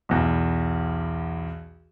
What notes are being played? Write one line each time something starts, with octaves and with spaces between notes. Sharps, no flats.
B1 E2